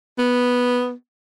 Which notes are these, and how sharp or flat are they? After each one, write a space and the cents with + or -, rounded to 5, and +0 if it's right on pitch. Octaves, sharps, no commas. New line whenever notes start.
B3 -5